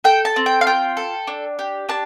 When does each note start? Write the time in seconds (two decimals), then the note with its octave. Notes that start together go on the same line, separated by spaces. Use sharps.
0.04 A4 G5
0.25 A5
0.36 C4
0.46 G5
0.61 F5
0.67 F4 G5
0.97 A4
1.27 D4
1.59 G4
1.89 D4 A5